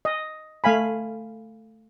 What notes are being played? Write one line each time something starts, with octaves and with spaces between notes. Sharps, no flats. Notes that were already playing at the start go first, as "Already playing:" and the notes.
D#5
A3 F5 G#5 B5